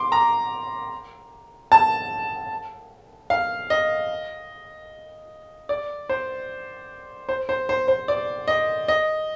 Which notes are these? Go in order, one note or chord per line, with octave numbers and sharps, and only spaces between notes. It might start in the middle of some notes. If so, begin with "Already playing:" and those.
Already playing: C6 D6
A#5
A5
F5
D#5
D5
C5
C5
C5
C5
C5
D5
D#5
D#5